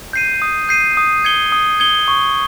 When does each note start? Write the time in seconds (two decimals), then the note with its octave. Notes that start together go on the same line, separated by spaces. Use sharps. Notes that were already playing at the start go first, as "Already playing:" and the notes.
0.13 G6 C7 D#7
0.42 D#6
0.69 G6 C7 D#7
0.97 D#6
1.25 G#6 C#7 G7
1.52 D#6
1.80 G#6 C#7 G7
2.08 C#6